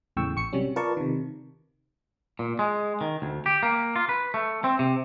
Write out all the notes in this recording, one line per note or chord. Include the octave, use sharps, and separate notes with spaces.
E2 A2 C#3 G5 C#6 E6
A1 C#6 C#7
C3 F#3 G3 C#4
F4 A#4 B4 D5 A5 C#6
C3 D#3
A#2
G#3
D#3
D2
G4
A#3
F4
B4
A3
C4
C3